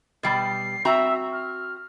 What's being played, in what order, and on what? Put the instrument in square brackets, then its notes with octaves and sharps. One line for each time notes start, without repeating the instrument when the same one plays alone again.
[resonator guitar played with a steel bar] B2 G3 G4 [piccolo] C7
[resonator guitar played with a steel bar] C4 F#4 A#5 [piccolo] E5
[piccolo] F6